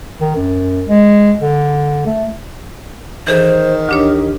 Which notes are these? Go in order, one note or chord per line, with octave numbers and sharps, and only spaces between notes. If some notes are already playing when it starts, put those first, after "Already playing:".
D#3
F#2
G#3
D3
A3
D#3 E3 G#4 A4 C5
D2 D4 G4 C#5